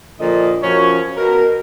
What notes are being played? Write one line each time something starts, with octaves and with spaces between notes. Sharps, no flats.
A#2 D3 F3 D#5
F#2 F3 C#4 C#5
B2 A#4